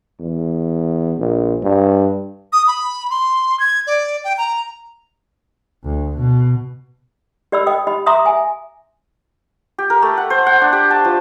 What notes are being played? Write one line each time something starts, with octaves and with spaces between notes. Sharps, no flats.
E2
A#1
G2
D#6
B5
C6
G#6
D5
G5
A#5
D2
B2
G4 D5 D#5 B5 E6
D#5 G5 D#6
G4 D#5 B5
E5 A#5 C6 D6 D#6
E5 G#5
G4
A#4
A3
F#5
C5
F#5
D4
G4
A5
F3